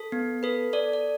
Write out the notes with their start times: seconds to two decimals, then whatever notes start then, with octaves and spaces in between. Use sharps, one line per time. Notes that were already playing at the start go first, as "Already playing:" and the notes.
Already playing: A4
0.12 B3
0.43 A4 B4
0.73 A4 D5
0.93 D5